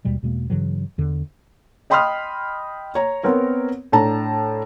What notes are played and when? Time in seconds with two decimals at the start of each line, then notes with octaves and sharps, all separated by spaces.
0.05 D#2 B2 G3 G#3
0.23 E2 B2 G#3 A#3
0.50 G2 C#3 E3 F#3
0.98 E2 D3
1.90 D#5 G5 B5 C6 D#6 F6
2.95 C#5 A#5
3.23 B3 C4 A#4 C#5
3.92 A2 D4 A5 A#5